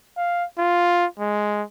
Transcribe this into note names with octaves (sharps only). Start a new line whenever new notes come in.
F5
F4
G#3